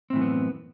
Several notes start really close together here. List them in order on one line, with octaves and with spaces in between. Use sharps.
C4 A2 E3 F#2 B3